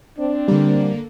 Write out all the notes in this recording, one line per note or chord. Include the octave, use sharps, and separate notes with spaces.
C4 D4
D3 G3 A#3